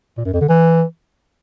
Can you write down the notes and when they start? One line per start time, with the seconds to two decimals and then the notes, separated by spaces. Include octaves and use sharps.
0.17 A#2
0.25 F#2
0.33 F2
0.41 D3
0.49 E3